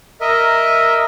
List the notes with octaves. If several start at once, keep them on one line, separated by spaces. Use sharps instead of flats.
A#4 D#5 E5